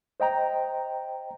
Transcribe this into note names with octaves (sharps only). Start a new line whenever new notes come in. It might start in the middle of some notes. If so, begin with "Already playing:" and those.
C5 D#5 G5 A#5